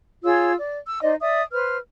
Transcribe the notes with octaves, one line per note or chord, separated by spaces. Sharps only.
F4 G#4 C#5 E6
D5
E6
D#4 C5 D5 D#5
D5 E5 D#6
B4 C5 F6